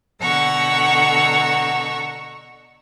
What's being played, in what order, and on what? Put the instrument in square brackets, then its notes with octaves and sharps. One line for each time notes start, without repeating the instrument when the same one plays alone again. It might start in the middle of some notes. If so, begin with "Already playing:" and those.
[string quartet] B2 D3 F#5 A#5 C#6 E6